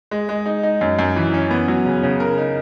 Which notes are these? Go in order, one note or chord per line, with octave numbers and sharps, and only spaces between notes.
G#3
G#3
D#4
D#4
F#2
F#2
E3
C#4
B3
F#3
C#3
C#3
A#4
D#4